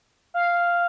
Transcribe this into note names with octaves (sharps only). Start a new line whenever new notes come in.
F5